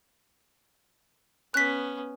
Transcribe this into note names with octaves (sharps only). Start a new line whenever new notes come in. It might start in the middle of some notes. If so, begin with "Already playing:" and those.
B3 C#4 F#6 B6